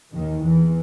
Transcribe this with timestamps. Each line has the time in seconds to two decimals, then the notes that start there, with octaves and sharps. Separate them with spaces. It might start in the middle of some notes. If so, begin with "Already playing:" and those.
0.13 D#2 D#3
0.42 E2 E3